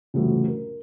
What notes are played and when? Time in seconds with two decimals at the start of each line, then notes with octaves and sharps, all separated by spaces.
0.14 F#1 C2 F2 A2 E3 F#3
0.48 A#4